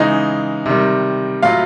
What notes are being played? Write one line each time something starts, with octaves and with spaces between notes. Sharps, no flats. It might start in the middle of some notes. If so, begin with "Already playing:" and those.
Already playing: C#3 E3 G#3 D#4 D#5
C3 D#3 G3
A2 F#3 F4 F5